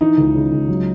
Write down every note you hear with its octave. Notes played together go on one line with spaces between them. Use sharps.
E3 D#4
C#2
C#3
C#2
F#3